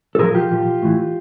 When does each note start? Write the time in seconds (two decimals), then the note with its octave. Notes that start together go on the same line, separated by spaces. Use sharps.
0.15 A4
0.19 A#2 F3 G#4 A#4
0.35 F4 G4
0.51 A#2 F3
0.82 A2 E3